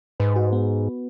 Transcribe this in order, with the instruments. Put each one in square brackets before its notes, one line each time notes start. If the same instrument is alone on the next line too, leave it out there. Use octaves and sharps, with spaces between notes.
[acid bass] G#2 [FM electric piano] B4
[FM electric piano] F#4
B3